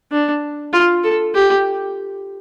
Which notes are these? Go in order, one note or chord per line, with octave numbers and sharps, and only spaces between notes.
D4
F4
A4
G4